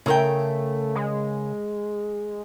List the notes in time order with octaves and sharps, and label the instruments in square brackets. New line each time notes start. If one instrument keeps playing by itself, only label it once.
[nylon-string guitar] C#3 A#4 G5 [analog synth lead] A3
[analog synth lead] G#3